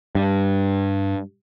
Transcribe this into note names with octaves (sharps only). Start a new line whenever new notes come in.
G2